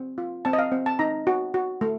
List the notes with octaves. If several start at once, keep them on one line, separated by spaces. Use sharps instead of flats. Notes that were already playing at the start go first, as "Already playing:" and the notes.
Already playing: C4
F4
C4 A5
D#5
F5
C4
A5
D#4 A#5
F#4
F#4
A3